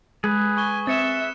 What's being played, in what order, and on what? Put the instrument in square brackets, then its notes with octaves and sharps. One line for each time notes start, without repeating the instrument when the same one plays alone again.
[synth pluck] G#3 [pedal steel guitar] G#4 B4
[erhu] G#5 [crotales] C#6 G7
[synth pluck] C4 [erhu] E5 [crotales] A6 C#7 E7